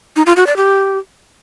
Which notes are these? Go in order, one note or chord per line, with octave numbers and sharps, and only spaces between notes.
D#4
F4
F#4
D5
G4